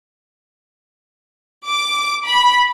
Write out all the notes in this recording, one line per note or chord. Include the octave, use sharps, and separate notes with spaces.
D6
B5